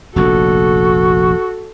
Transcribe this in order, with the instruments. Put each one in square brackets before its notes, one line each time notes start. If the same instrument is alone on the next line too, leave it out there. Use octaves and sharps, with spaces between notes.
[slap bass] F1 A#1 [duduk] F#4 [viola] A4